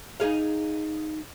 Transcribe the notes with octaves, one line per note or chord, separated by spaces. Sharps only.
D#4 G#4 F5